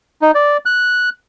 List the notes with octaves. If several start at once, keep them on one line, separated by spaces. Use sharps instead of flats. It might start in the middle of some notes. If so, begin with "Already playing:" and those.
D#4
D5
F#6